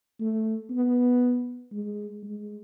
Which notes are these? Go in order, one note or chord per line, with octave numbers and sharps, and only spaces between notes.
A3
B3
G#3
G#3